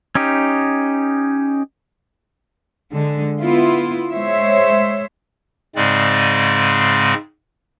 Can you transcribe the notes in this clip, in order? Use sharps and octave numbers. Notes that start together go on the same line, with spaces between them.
C#4 D#4 G4
D3 G#3
B3 E4 F4
G#3 C5 C#5 E5
G#2 C#3 G#3 C4 D5